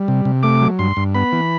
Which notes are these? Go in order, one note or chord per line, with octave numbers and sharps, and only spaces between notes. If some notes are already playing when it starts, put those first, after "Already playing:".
Already playing: G3
C3
C3
A3 D6
F#3
G2 C6
G2
B3 B5
E3